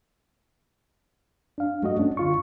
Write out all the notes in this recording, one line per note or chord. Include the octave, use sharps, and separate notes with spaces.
D4 F5
G3 A3 F#4 D#5
C#4 D4
D3 F4 C#6